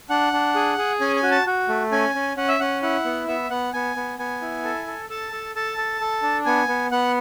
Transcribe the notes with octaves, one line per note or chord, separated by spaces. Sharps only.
D4 F#5
D4
G#4
G#4
C#4 G#5
G#5
F#4
A5
F#4
A3
C#4 G#5
C#4
C#4 F#5
E5
C#4 F#5
E4 F#5
B3
B3 E5
B3 F#5
B3 G#5
B3
B3 G#5
E4
A4
A4
A4 A5
A4
A4 A5
A4
A4
D4
B3 G#5
B3
B3 F#5